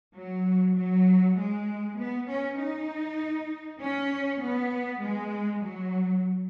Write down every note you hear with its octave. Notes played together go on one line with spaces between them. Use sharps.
F#3
F#3
G#3
B3
C#4
D#4
C#4
B3
G#3
F#3